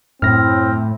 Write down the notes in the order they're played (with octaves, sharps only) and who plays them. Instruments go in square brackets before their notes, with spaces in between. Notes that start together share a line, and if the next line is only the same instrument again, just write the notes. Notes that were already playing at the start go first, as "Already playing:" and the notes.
[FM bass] F#2 [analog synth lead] A2 [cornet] C4 [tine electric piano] F6 A#6